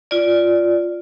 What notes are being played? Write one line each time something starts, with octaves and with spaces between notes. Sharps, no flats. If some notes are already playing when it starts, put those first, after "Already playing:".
F4 D5